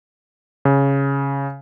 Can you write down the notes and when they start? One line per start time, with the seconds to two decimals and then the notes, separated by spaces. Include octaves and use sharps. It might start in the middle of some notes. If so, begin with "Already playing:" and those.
0.65 C#3